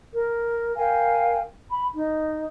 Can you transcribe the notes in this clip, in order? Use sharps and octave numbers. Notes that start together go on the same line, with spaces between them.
A#4
A#4 F5 G5 G#5
B5
D#4